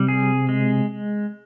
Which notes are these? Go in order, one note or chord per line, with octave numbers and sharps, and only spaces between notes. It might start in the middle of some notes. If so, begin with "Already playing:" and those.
Already playing: C3 G3
G#4
G#3